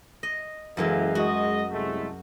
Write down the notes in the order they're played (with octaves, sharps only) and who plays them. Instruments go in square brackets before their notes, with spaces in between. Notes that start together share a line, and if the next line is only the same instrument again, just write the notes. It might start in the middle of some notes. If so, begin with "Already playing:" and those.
[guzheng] D#5
[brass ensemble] F#1 A4 F5 [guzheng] F#2 E3 G#3
[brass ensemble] G#3 D#5 [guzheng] F#4
[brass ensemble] C2 G#3 A3